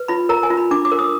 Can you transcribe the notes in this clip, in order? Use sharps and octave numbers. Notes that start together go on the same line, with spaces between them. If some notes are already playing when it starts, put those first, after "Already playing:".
Already playing: B4
F4 B5
A#4 A#5
G#5
F4
B5
D4 D6
D6
A#4
D#6